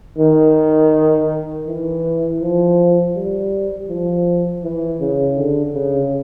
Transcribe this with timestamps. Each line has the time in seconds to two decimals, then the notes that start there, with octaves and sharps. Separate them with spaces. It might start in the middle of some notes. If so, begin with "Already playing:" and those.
0.18 D#3
1.67 E3
2.40 F3
3.15 G3
3.88 F3
4.63 E3
5.00 C#3
5.37 D3
5.74 C#3